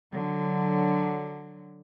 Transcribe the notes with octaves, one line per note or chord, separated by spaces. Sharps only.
D3 F#3